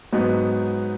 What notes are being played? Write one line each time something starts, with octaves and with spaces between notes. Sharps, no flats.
G#2 F#3 B3 D#4